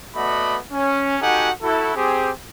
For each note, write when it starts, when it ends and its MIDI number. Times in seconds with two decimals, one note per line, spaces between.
0.16 0.58 57
0.16 0.58 59
0.16 0.58 66
0.16 0.58 74
0.16 0.58 75
0.16 0.58 83
0.73 1.17 61
1.21 1.51 63
1.21 1.51 66
1.21 1.51 67
1.21 1.51 69
1.21 1.51 78
1.21 1.51 80
1.63 1.96 64
1.63 1.96 66
1.63 1.96 69
1.96 2.30 60
1.96 2.30 67
1.96 2.30 68